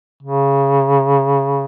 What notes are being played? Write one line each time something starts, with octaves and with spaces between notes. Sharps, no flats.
C#3